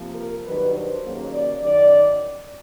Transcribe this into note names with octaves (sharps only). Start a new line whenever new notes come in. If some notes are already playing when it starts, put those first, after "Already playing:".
Already playing: C3 F3 A#3
A#4
G2 D#3 F#3 B4
C5
D#2 C#3 F#3 A#3
D5
F#2 D#3 D5